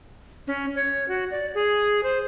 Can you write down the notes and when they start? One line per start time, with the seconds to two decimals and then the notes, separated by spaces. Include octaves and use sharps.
0.47 C#4
0.76 C#5
1.08 F#4
1.31 D5
1.55 G#4
2.03 C5